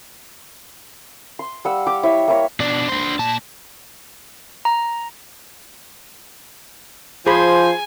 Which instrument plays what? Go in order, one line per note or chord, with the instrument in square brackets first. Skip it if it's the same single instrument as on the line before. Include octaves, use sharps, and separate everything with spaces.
[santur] C6
G3 F5 F#5 E6
G4 D6
E4 C#5 E5
A#3 E4 C#5
[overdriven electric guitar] B2 D4
D4 C5
A#2 A5
[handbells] A#5
[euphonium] F3 [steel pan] G#4 B5 [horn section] C5 [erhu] G#5